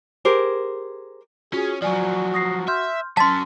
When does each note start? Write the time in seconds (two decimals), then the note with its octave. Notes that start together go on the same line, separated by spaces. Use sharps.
0.25 G4 G#4 A#4 C5
1.53 C#4 F4 F#4 G#4
1.82 F3 F#3 F#4 D5 G#5
2.34 D#6 A#6 C7
2.68 E5 C6 F6 G6
3.17 F#3 C#4 A5 C6 A6 B6